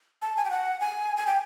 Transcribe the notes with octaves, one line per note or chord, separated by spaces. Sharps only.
A5
G#5
G5
F#5
G#5
G#5
G5